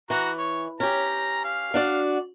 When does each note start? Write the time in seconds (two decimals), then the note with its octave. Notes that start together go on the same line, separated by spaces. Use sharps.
0.10 E3 F#4 A#5
0.38 C#5
0.80 C#4 G4 A#5
1.44 F5
1.74 D4 F#4 D5